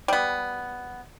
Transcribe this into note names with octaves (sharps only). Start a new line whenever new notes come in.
G3 B3